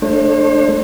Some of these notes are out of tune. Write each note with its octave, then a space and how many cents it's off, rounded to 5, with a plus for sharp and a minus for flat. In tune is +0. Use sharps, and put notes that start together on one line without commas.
A3 +0 D4 +15 C5 +40